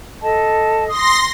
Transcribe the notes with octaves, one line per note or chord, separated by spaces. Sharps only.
A4 D#5 A5
C6 D#6 A#6